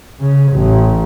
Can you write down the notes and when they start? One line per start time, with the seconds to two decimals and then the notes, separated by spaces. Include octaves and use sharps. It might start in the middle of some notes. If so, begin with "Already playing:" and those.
0.20 C#3
0.53 A1